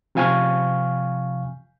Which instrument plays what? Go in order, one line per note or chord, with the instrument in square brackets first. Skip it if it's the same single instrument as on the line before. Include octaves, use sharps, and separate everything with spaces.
[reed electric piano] C3 F3 F5 G#5 C#6 F6